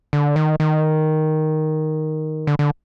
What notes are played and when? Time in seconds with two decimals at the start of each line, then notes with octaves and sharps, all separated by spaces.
0.13 D3
0.36 D#3
0.60 D#3
2.47 D3
2.59 D3